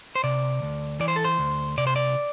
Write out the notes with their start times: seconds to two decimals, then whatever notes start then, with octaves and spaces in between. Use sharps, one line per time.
0.15 C5
0.24 C3 D5
0.62 D2
1.00 E3 D5
1.08 C5
1.16 A4
1.24 C5
1.38 D2
1.78 C3 D5
1.87 C5
1.96 D5